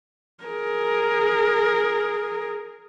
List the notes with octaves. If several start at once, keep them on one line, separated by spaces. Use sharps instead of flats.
G#4 A#4